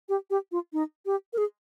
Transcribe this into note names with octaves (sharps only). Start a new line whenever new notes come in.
G4
G4
F4
D#4
G4
A#4
G#4